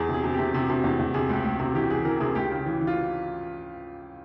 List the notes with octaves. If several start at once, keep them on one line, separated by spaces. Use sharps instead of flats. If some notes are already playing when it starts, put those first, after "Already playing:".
Already playing: E2 G#4
C3
G#4
C3
C3 G4
C3
C3
E2
E2
C3 G#4
C#2
C#2
C3
E3 G4
E3 G#4
E3 A#4
C3 G#4
C#2 G4
C#3
E3
E3
F4